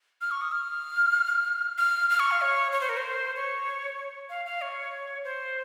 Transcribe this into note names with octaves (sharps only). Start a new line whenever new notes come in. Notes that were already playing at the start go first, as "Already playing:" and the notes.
F6
C#6
D#6
F6
F6
F6
C#6
F5
C#5
C#5
C5
A#4
C5
C#5
F5
F5
C#5
C5